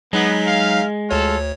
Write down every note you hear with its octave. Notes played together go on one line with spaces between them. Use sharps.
F#3 G#3 B3 D#4 B6
F5
D2 F4 A4 C#5